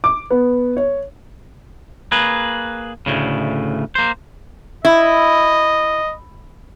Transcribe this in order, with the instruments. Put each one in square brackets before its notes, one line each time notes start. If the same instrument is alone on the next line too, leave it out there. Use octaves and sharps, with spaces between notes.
[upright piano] D6
B3
C#5
[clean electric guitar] A#3 G#4 B4
D2 A2 C#3
A#3 C5
[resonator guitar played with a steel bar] E4 [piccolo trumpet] D#5